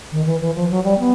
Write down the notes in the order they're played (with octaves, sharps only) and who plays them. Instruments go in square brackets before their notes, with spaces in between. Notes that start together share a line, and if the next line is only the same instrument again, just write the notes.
[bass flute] D#3
E3
E3
F3
F#3
G3
B3